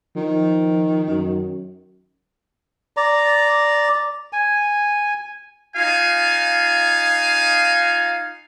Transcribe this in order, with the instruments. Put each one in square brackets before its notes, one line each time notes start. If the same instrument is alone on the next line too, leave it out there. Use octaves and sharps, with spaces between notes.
[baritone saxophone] D#3 [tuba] F3
[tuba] F#2
[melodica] D5 A#5
G#5
[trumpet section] D#4 F4 F5 G#5